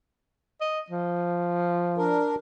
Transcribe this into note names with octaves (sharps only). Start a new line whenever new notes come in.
D#5
F3
D4 A#4